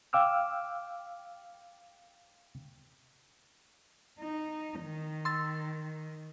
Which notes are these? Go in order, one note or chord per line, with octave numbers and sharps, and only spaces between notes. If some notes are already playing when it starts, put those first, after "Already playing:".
F5 G5 D6 E6 F6
D#4
D#3
C6 E6 A6